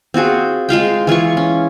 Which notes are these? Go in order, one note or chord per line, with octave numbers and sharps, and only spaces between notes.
C4 F4 F#4 G#4
G#3 F4 F5 G5
E3 F4 G#4 C#6
C#4